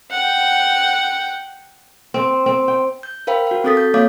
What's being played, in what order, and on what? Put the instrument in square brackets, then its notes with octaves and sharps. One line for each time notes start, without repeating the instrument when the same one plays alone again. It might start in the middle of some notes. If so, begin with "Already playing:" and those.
[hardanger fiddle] F#5 G5
[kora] C4
C4
G5
[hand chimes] G6
A#4 C5 F5 G5 B5
F#4 F5
C4 F#4 A4 D#6 A6 B6
G6
A#3 C#5 F5 D6 G6